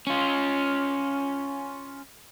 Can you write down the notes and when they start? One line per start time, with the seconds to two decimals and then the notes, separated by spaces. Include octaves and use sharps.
0.07 C#4 F4